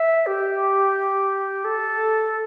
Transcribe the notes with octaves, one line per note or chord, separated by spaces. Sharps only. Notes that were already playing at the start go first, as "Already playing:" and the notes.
Already playing: E5
G4
A4